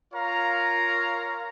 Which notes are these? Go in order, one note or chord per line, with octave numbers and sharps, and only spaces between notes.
F4 A#4 C#5 F5 A#5